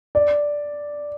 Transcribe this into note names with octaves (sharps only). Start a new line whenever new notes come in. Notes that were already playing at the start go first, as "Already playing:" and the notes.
D5